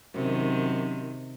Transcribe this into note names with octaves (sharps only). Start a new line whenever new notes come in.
F#2 C3 D#3